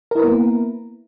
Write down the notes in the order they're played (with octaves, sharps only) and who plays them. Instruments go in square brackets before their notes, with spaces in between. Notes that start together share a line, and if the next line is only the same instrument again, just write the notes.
[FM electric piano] A#4
E4
B4
B3
A#3